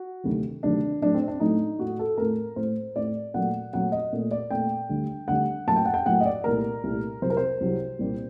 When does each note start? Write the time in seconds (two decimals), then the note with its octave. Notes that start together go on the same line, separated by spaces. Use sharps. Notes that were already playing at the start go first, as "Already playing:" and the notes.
Already playing: F#4
0.24 D2 C3 D#3 F#3
0.63 D2 C3 D#3 F#3 D4
1.01 A2 F#3 A3 D4
1.14 C4
1.28 D4
1.40 A2 F#3 A3 D#4
1.79 A2 A3 F#4
1.99 A4
2.18 A2 A3 A#4
2.56 A2 A3 C5
2.96 A2 A3 D5
3.34 A#2 F#3 A3 F#5
3.73 A#2 F#3 A3 F#5
3.92 D#5
4.13 A#2 A3
4.31 D5
4.51 A#2 A3 G5
4.89 D2 D3 G3
5.28 D2 D3 G3 F#5
5.67 A2 F#3 A#3 A5
5.76 G5
5.85 F#5
5.94 G5
6.06 A2 F#3 A#3 F#5
6.20 D#5
6.26 D5
6.44 C2 A#2 A3 A#4
6.84 C2 A#2 A3
7.22 C2 C3 F#3 C5
7.30 A#4
7.37 C5
7.61 C2 C3 F#3
7.99 C2 A#2 G3 A#3